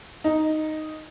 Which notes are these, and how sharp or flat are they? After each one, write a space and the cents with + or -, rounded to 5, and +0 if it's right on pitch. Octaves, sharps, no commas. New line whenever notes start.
D#4 +0 D#5 +10